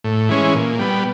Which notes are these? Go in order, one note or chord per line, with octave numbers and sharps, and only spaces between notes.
A2
E3 G#3 C#4
A#2
G3 B3